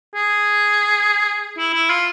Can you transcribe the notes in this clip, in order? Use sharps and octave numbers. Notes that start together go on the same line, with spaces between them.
G#4
E4
E4
F4